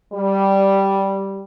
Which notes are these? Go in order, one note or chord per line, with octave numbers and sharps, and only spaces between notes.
G3